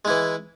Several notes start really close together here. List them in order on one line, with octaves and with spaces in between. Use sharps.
G#3 E4 E3